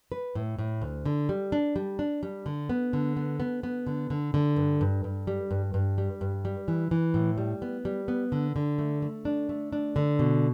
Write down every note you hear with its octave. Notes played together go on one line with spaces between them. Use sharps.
B4
A2
A2
D2
D3
G3
D4
G3
D4
G3
D3
B3
D3
B3
B3
B3
D3
D3
D3
G2
G2
G2
G3
G2
G2
G3
G2
G3
E3
E3
A2
G3
B3
G3
B3
D3
D3
A3
A3
D4
A3
D4
D3
B2